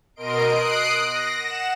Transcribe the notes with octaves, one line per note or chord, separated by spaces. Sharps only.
B2 A#4 D#5 C6 D7
D#6 F#6 C7 D7
A#6
F#5 E7